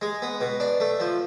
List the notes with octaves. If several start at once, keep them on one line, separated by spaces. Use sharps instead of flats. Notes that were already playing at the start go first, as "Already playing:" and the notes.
G#3
B3
B2
D4
A3
F3